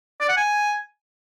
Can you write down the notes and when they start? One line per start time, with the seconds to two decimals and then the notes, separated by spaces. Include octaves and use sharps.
0.21 D5
0.29 F#5
0.37 G#5